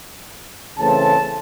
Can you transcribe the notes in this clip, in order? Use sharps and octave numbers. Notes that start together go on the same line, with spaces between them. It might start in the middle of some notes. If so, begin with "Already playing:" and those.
C#3 E3 A3 C4 A5